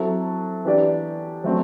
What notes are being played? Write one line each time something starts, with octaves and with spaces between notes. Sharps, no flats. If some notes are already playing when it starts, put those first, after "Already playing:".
Already playing: F#3 C4 E4 A4
E3 B3 D4 G4 D5
F#3 A3 C4